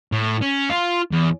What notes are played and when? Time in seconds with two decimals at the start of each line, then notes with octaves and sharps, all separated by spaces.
0.12 A2
0.42 C#4
0.69 F4
1.12 E2